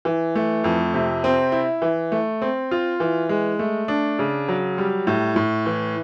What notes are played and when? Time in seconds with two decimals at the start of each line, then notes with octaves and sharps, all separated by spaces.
0.05 E3
0.35 A3
0.64 F2
0.94 C3
1.24 C4
1.52 E4
1.82 E3
2.12 A3
2.42 C4
2.71 F4
3.00 E3
3.29 G#3
3.59 A3
3.88 D4
4.19 C#3
4.48 F#3
4.78 G3
5.07 A2
5.36 A2
5.66 E3